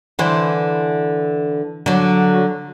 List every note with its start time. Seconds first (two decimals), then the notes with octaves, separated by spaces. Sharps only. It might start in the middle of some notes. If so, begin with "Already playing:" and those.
0.19 D3 E3 C5
1.86 D3 F#3